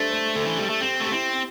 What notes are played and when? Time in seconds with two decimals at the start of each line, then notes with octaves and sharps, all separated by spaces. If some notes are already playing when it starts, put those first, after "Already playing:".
Already playing: A3 D4 G4 A4 C5
0.10 C5
0.35 D3 A4
0.46 E3
0.57 G3 G4
0.70 A3
0.81 C4 G4
1.00 A3 G4
1.11 C4 E4